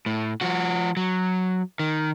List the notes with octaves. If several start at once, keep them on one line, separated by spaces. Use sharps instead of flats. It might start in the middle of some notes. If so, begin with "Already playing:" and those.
A2
F3 F#4
F#3
D#3